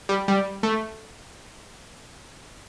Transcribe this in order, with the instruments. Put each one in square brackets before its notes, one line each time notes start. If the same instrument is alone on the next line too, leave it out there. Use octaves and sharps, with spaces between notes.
[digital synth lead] G3
G3
A3